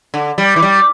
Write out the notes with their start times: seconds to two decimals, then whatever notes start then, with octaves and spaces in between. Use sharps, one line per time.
0.14 D3
0.38 G3
0.56 E3
0.62 G3